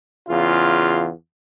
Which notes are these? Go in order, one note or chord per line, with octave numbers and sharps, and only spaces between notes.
E2 C#3 F4